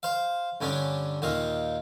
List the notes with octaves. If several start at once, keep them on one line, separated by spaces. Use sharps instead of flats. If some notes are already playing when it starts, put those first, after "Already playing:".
C5 F5
G2 D3 C#4 D4
D#2 A#2 D#3 F5